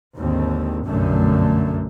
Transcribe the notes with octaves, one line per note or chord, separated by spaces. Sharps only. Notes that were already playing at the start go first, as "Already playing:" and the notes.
G#1 D#2 D3 C4
F1 B1 F#2 D3 A3